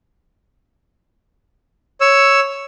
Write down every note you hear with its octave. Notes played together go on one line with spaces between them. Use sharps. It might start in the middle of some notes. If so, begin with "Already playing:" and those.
C#5 E6